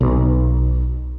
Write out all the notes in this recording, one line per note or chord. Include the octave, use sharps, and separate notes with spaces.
B1